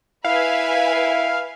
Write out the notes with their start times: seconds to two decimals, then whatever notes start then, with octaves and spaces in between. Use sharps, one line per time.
0.25 E4 B4 E5 F5 G#5